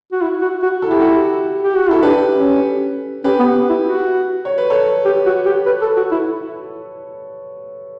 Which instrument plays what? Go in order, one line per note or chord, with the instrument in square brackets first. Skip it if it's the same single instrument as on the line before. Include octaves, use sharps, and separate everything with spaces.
[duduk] F#4
E4
F#4
F#4
[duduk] E4 [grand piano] A4
[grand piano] G4
F#4 A4
[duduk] G4
F#4
[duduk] E4 [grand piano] A4
[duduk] D4 [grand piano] G4 B4
[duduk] C#4
[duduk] C#4 [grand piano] G4 B4
[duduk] B3
E4
F#4
[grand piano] C#5
B4
A4 C#5
[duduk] G4
F#4
G4
B4
A4
F#4
E4